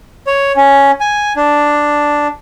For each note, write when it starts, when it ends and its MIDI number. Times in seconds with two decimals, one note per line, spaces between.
0.27 0.52 73
0.56 0.91 61
1.00 1.33 80
1.36 2.28 62